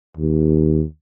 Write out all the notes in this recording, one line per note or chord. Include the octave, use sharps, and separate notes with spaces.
D#2